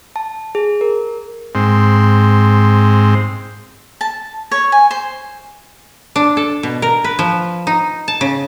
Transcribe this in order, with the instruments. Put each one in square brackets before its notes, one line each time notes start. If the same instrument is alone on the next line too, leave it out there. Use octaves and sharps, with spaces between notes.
[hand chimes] A5
G#4
A#4
[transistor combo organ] G#2 C4
[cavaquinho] A5
C#5
G#5
C5
[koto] D4
A4
B2
A#4
B4
F3
D#4
A5
C#3